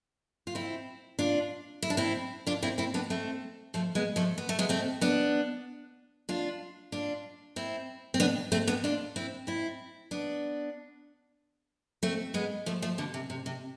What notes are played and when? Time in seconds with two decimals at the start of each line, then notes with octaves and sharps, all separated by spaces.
0.47 F4
0.55 C4 E4
1.19 D4 F4
1.82 E4
1.90 D4
1.97 C4 E4
2.47 D4 F4
2.62 C4 E4
2.78 C4 E4
2.94 B3 D4
3.10 A3 C4
3.74 F3 A3
3.95 G#3 B3
4.16 F3 A3
4.38 B3
4.49 A3
4.59 G#3 B3
4.69 A3 C4
5.01 B3 D4
6.29 D4 F4
6.92 D4 F4
7.56 C4 E4
8.14 C4
8.20 B3 D4
8.52 A3 C4
8.67 B3 D4
8.84 D4 F4
9.16 C4 E4
9.47 C4 E4
10.11 B3 D4
12.03 A3 C4
12.34 G#3 B3
12.66 F3 A3
12.82 F3 A3
12.98 B2 D3
13.14 C3
13.30 C3
13.46 C3